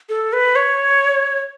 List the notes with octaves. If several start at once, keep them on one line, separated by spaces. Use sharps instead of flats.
A4
B4
C#5